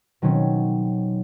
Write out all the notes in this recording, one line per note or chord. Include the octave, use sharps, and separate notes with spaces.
B2 D#3 F#3 C4 C#4